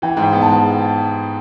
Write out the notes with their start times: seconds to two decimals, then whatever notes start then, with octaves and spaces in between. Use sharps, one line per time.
0.02 E3 G5
0.17 G#2
0.22 G5
0.33 B3
0.42 A5
0.47 G#3